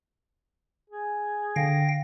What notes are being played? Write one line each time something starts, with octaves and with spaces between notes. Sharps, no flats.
G#4
D3 F5 G5 A#6